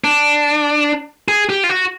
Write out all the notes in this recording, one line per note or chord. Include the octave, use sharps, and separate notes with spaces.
D4
G#4
G4
F4
F#4